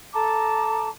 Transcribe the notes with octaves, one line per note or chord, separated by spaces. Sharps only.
A4 A5 A#5 D6